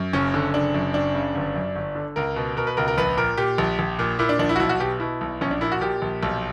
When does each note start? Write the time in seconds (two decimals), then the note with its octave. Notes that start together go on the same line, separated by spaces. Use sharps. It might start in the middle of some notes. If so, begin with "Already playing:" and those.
Already playing: F#2
0.13 F#1 C#4
0.34 D3
0.54 F#1 D4
0.74 F#2
0.94 F#1 D4
1.15 C#3
1.35 G1
1.55 F#2
1.76 G1
1.95 D3
2.16 C#2 A#4
2.36 B2
2.57 B2 A#4
2.67 B4
2.77 C#2 A#4
2.88 A#4
2.98 A#1 B4
3.17 A#2 A#4
3.37 A#2 G4
3.58 A#1
3.79 A#1
3.99 A#2
4.19 A#2 E4
4.29 D4
4.39 A#1 D4
4.49 E4
4.56 F#4
4.60 B1 E4
4.69 F#4
4.80 B2 G4
5.00 B2 E4
5.21 B1
5.41 A#1 C#4
5.51 D4
5.61 A#2 E4
5.72 F#4
5.81 A#2 G4
6.02 A#1
6.23 B1